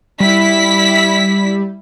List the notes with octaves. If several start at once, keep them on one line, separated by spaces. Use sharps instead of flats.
G3 E4 B6